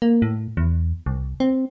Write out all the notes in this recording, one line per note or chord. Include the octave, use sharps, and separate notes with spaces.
A#3
A2
E2
C2
C4